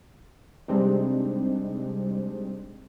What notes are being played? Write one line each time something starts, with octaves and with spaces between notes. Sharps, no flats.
C3 G3 G#3 C4 D4 D#4